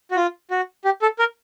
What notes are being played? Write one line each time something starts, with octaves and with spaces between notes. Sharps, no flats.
F#4
F4
F#4
G4
A4
A#4